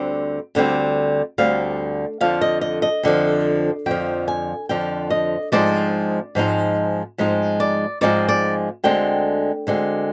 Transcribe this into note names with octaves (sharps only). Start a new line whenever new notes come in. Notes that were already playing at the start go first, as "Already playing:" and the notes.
Already playing: D2 D3 G3 C4
D2 D3 G3 C4
D2 D3 G3 C4 F5
F2 D3 F3 F5
D#5
D#5
D#5
F2 D3 F3
F2 D3 F3 G5
G#5
F2 D3 F3 G5
D#5
G#2 F3 G#3 C4 D#4 D5
G#2 F3 G#3 C4 D#4
G#2 F3 G#3 C4 D#4
D5
G#2 F3 G#3 C4 D#4 D5
D5
D2 D3 G#3 C4 G5
D2 D3 G#3 C4